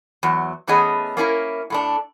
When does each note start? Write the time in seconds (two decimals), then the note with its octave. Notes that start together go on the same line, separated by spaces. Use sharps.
0.23 E2 F#3
0.67 E3 A3 B3 C#4 G#4 D#5
1.17 A#3 C#4 E4 A#4
1.70 A2 A3 D4